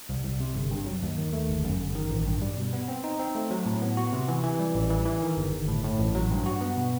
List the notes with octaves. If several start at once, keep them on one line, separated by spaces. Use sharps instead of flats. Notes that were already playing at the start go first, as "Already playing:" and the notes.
C2
C2
C3
G1
G2
F#3
D#2
D#3
A3
G1
F#2
G1
D#3
A1
G2
G3
B2
B3
C4
D#4
C4
A3
F#3
A2
B3
F#4
C3
E3
E3
G3
A1
E3
E3
D#3
G1
G1
A2
A2
A1
F#3
G2
F#4
B3
B2